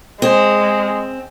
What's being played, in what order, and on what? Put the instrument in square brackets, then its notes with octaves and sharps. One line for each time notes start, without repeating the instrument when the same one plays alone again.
[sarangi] G#3 [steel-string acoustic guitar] C4